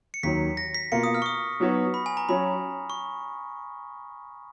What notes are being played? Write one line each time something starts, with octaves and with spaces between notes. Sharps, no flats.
C#7
D#2 D#3 F#3 B6
A#6
B6
B2 A#3 F4 C#7
D#6
F6
C#6
D#6
F#3 B3 D#4 F#4 C#5
B5
G#5
A#5
F#3 C#4 F#4 C#5 B5
C#6